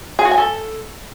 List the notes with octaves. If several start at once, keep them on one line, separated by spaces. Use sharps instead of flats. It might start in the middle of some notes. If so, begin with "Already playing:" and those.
G#4
F#4
G#5
A4